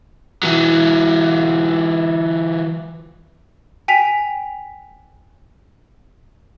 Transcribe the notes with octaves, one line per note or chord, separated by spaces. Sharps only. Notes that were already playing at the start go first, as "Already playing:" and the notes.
E3 F#3
G5 G#5 B6 F7